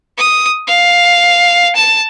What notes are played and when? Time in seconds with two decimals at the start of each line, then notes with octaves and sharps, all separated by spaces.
0.18 D#6
0.67 F5
1.75 A5